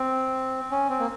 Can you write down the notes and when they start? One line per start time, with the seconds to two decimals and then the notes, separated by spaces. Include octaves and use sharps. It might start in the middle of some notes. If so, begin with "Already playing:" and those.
Already playing: C4
0.71 C#4
0.89 C4
0.99 A#3